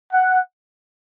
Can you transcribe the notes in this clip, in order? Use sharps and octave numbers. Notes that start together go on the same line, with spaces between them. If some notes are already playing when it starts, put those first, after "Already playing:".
F#5